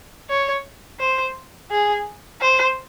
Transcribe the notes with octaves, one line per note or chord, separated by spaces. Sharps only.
C#5
C5
G#4
C5